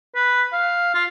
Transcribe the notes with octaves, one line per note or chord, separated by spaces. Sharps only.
B4
F5
F4